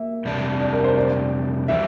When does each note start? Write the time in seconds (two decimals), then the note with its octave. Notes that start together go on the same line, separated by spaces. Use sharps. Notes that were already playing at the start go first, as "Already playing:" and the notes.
Already playing: A#3 E5
0.25 F2 C3 G3 D4
0.60 D5
0.72 A#4
0.84 C5
0.97 D5
1.68 E3 G3 C4 E5